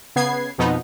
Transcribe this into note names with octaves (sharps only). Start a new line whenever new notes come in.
C#3 B3 G#6 C7
F2 B2 F3 B3 D#4